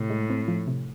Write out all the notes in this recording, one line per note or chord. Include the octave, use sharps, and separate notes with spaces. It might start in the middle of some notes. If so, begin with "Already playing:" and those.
Already playing: A2 C3
G#3
C4
F3
C3